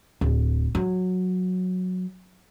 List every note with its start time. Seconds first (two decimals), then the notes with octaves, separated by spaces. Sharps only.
0.21 D1
0.75 F#3